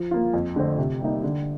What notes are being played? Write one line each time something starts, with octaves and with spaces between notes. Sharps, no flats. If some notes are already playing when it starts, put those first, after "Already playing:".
Already playing: F3
A#3 F4
F2
D3 A3 C4
C3
G3 A#3 D#4
D3